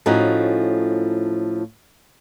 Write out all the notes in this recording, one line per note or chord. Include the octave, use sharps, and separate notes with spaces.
A2 F3 C#4 D#4 F#4